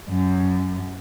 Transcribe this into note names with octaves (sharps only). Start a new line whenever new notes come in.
F#2